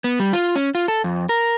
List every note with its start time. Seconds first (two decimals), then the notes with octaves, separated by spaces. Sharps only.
0.04 B3
0.20 G3
0.33 F4
0.55 C#4
0.75 F4
0.88 A4
1.04 F2
1.29 A#4